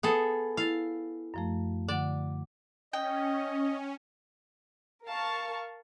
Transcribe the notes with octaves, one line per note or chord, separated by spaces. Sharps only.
B3 G#4 A4 D#6
E4 F5 A6
F#2 F3 A3
D3 D5 F#5
C#4 D#5 G5
A#4 F5 A5 C#6